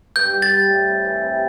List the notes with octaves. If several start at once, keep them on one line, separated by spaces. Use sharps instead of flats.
G2 G6
G4
A6
G3
A2
C4
E3
C3